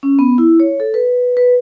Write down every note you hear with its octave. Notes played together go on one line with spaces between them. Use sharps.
C#4
B3
E4
C#5
A4
B4
B4